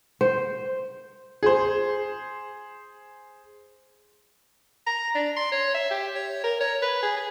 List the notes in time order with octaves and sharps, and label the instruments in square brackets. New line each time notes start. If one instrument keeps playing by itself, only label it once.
[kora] C5
[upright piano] G#4 C5
[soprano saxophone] A#5
D4
C6
C#5
E5
G4
C#5
A#4
C#5
B4
G#4
G#4